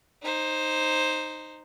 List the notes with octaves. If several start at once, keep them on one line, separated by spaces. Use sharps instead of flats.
D#4 C5